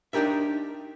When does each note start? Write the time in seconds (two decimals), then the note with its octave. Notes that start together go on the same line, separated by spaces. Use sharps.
0.13 D4 D#4 G4 A#4 E5